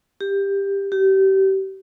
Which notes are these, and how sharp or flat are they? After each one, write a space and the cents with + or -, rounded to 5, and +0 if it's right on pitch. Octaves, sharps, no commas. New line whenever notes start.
G4 +15
G4 -30